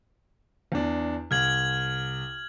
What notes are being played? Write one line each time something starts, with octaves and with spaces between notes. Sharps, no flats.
E2 D4
C2 F6 G#6 F#7